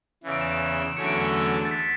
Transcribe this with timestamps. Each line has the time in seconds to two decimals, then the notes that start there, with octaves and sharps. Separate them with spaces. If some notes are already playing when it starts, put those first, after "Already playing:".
0.23 E2 C#3 E3
0.32 D7
0.41 E7
0.51 D7
0.60 E7
0.96 E2 D3 F#3 A3 C#4 C#7
1.06 D7
1.15 C#7
1.65 A6
1.71 B6